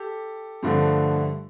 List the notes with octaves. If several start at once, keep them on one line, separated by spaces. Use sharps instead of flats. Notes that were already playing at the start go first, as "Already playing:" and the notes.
Already playing: G4 A4
G2 D3 F3 A3